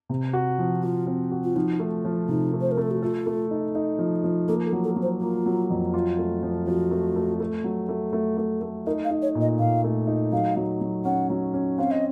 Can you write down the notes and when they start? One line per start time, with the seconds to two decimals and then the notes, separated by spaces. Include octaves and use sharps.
0.09 C3
0.33 F#4
0.58 F3
0.83 F4 F#4
1.07 C4
1.32 F#4
1.44 F4
1.56 F3 D#4
1.80 A3
2.05 F3
2.28 C3 D#4
2.54 A3
2.61 C5
2.71 A#4
2.77 A3 A4
2.91 F#4
3.02 F4 A4
3.26 A3
3.51 D#4
3.75 D#4
3.99 F3
4.24 F3
4.48 A#3 A4
4.66 A4
4.73 F#3
4.84 A4
4.96 F#3
5.02 C5
5.21 A#3 F4
5.46 F#3
5.70 F2
5.94 F4
6.19 A3
6.43 F3
6.67 F3 F#4
6.91 A3
7.16 A3
7.40 A3
7.64 F#3
7.89 A3
8.13 A3
8.37 A3
8.61 A3
8.86 D#4 A#4
9.04 F5
9.11 D#4
9.22 C#5
9.35 A#2
9.41 D#5
9.59 A#2 F5
9.84 A3
10.07 D#4
10.32 F#3 F5
10.56 F#3
10.81 F#3
11.05 C#4 F#5
11.30 F#3
11.53 C#4
11.78 C4 F5
11.91 D#5